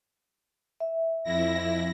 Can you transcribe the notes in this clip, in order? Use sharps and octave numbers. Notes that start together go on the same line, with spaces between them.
E5
F2 E4 A#6